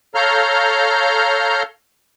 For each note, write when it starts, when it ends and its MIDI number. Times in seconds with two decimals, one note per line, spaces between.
0.15 1.63 69
0.15 1.63 73
0.15 1.63 77
0.15 1.63 82
0.15 1.63 89
0.15 1.63 91